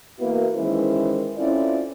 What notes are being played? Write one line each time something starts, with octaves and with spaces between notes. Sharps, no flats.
E3 A#3 B3 E4 F#4 B4
D#3 E3 G#3 C#4 E4 C5
C4 C#4 E4 F4 A4 D5